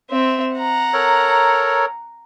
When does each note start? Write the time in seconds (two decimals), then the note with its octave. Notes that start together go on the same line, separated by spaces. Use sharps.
0.10 C4 E5
0.55 F#5 A#5
0.93 A4 A#4 C#5